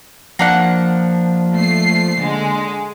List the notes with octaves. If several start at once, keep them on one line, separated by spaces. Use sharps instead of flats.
F3 A#3 D4 F#5
A3 C7
D3 G#3